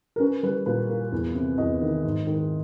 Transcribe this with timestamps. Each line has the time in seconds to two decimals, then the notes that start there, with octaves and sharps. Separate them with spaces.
0.16 A#4
0.20 C#4 B4
0.43 G3 B4
0.66 A#2 B4
0.89 A#3
1.12 E2
1.35 C3
1.58 E2 D#5
1.81 D#3
2.04 G#2
2.27 D#3